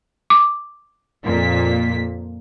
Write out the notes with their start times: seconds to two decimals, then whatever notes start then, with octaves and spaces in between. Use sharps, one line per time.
0.30 D6
1.24 F2 A#2 B6